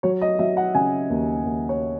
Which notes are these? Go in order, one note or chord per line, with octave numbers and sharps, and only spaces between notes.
F#3 C#5
D#5
F#3 E5
F#5
C#3 G#5
D#2
D#2
C#5